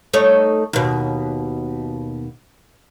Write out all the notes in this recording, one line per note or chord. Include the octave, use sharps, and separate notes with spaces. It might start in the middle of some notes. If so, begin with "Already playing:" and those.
A3 D#4 C#5
D#2 B2